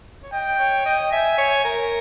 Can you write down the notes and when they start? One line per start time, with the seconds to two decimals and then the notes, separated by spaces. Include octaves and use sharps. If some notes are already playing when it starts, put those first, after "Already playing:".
0.23 C#5
0.33 D#5 G5
0.59 C#5
0.86 D#5
1.12 E5 G#5
1.38 C#5
1.65 A#4